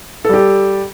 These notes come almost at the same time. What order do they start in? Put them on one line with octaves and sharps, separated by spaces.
A4 G3 G4